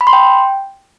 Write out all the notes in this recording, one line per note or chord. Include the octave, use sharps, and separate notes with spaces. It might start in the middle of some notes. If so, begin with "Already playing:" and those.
B5
C6
G5